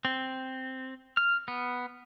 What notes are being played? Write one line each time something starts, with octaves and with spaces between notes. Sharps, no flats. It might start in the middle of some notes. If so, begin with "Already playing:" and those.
C4
F6
B3